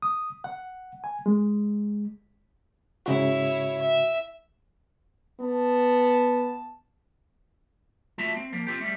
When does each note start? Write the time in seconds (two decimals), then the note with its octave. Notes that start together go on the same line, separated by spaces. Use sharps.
0.02 D#6
0.44 F#5
1.04 G#5
1.26 G#3
3.06 G#2 C#3 E4 F#4 C#5
3.81 E5
5.40 B3 A5
8.18 A3 F4 F#4 E5 A5 A#5
8.37 C4
8.53 F3 A#3
8.67 C4 F4 G4
8.81 G3 A3